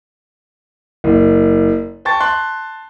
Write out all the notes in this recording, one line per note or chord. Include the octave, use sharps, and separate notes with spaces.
F#1
G5 A5 C#6 A6
A5 C6 F#6